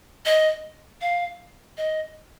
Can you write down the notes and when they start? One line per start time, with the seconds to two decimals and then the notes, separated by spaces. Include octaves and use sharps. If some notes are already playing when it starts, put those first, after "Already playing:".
0.26 D#5
1.01 F5
1.78 D#5